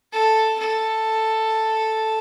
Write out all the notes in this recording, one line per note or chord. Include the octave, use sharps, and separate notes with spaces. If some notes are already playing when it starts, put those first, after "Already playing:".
A4
A4